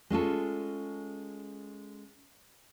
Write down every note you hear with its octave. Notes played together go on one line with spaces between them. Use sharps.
G#3 C#4 F4 A4